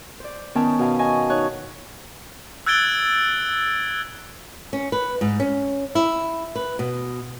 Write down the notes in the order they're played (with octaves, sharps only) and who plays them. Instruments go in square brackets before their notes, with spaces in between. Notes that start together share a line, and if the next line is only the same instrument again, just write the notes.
[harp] C5 D5
D#3 B3 C#4 G5 A5
B2 F5 G#5 A5
D#5 G#5 A5 C#6
D#4 C#5 F#6
[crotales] E6 F#6 G#6 A6 D7 G7
[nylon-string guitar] C#4
B4
G#2
C#4
E4
B4
B2